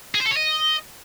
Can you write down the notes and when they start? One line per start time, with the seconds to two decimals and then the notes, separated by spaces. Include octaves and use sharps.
0.15 G#4
0.20 C5
0.25 A4
0.31 C#5
0.36 D#5